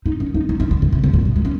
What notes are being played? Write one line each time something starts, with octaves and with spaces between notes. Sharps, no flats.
D#4
C#4
D#4
D#4
C#4
D#3
C#3
C3
C3
A#2
F#3
G#3
C#4